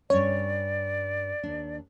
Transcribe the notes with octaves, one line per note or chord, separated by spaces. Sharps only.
G2 C#4 C#5 D5
D#2 D4